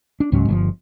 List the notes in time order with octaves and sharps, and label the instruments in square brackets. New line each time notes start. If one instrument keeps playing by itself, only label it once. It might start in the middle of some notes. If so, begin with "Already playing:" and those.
[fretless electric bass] D4
C#2 G#2 F#3 C#4
G1 A#2 F3